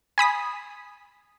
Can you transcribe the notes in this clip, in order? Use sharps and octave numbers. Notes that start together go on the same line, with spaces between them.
G#5 B5 D#6 B6